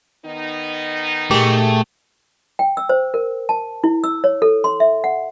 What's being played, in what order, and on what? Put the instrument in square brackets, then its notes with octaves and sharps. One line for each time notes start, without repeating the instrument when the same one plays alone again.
[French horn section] D#3 B3 D#4
[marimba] A#2 [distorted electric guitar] A3 [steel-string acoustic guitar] G4 G#4
[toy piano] G5
E6
C5
A#4
A5
E4
E6
C#5
A4
C6
E5
F#5